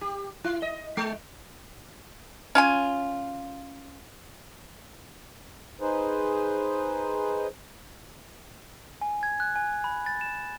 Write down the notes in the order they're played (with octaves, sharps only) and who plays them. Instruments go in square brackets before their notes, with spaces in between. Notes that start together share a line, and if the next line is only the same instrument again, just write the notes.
[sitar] G4
E4
D#5
G#3
[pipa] C#4 F4 G#5
[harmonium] D#4 G#4 B4 C5
[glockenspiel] G#5
G#6
F#6
G#5
B5
A6
E7